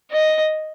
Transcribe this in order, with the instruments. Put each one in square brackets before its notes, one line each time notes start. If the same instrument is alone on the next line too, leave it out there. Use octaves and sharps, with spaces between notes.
[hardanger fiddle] D#5